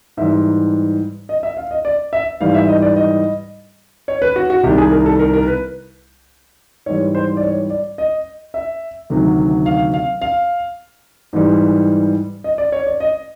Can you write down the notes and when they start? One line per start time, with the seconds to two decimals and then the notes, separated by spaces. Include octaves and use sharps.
0.17 G#2 E3 G3 E5
1.29 D#5
1.43 E5
1.57 F5
1.71 D#5
1.85 D5
2.13 E5
2.41 G#2 E3 G3 F5
2.54 E5
2.68 D#5
2.82 D5
2.96 D#5
4.08 C#5
4.22 B4
4.36 F#4
4.50 F#4
4.63 C2 C3 D#3 G3 G4
4.78 G#4
4.91 A#4
5.06 A4
5.19 A#4
5.33 A#4
5.47 B4
6.86 G#2 E3 G3 C#5
7.15 C5
7.37 D5
7.42 C#5
7.70 D5
7.98 D#5
8.54 E5
9.10 D2 C3 D#3 F#3
9.66 F5
9.94 F5
10.22 F5
11.33 G#2 E3 G3
12.44 D#5
12.58 D5
12.72 C#5
12.87 D5
13.00 D#5